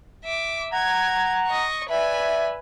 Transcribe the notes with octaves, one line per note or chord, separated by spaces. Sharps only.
E5 D6
F#5 A#5 G#6
D#5 C#6
B4 D5 E5 G#5